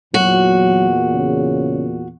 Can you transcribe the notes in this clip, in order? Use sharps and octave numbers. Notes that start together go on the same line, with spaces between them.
E2 A#2 F#3 F#4
C#3